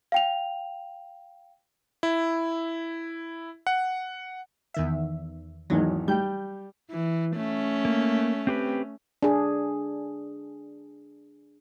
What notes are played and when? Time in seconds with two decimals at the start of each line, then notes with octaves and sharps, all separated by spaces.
0.12 F5 G5 F7
2.03 E4
3.67 F#5
4.74 E2 D#3 E5
5.70 G#1 E2 F#3 D#4
6.08 G3 G5 G6
6.90 E3
7.36 A3 C#4
7.85 A#3
8.47 C4 G4 B4
9.23 D4 G#4